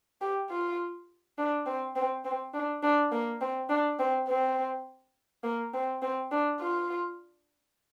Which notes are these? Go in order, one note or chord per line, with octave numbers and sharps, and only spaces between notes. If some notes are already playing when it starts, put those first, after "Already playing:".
G4
F4
D4
C4
C4
C4
D4
D4
A#3
C4
D4
C4
C4
A#3
C4
C4
D4
F4